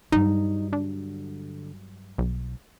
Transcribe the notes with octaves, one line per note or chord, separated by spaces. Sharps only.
G2 F#3 D#4
D3
B1